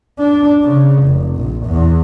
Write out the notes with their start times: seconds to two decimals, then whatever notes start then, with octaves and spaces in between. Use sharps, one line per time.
0.19 D4
0.64 C#3
1.03 F1
1.36 A#1
1.65 E2